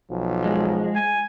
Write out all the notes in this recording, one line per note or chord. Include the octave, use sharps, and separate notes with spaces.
B1 F3
G#3
G#5